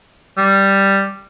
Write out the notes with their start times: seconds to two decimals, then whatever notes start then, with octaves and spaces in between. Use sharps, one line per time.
0.38 G3